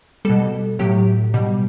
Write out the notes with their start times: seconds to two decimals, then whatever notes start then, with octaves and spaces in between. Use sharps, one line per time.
0.25 B2 G3 A4
0.79 A2 F#3 G4
1.34 B2 G3